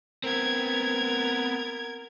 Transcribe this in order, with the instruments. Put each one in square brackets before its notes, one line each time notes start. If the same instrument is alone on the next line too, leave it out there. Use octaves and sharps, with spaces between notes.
[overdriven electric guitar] B3 C4 [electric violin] A#4 G#6